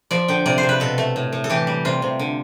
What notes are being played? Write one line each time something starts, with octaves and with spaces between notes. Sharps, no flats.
F3 D5
D3 G5
C3 D5
C5
C3
B4
B2 A4
A3
A2
A2
A4
E3 G4
G3
C3 F4
C3
D3